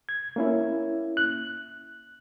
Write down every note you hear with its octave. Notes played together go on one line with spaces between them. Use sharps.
G#6
A#3 C#4 E4
F#6